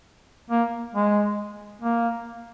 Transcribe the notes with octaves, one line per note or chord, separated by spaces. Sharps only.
A#3
G#3
A#3